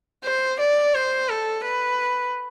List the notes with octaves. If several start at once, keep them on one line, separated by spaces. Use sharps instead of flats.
C5
D5
C5
A4
B4